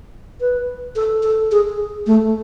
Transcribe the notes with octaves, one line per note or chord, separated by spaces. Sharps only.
B4
A4
A4
G#4
A3